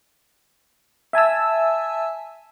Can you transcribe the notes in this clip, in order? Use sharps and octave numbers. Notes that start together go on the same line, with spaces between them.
E5 G#5 A5 E6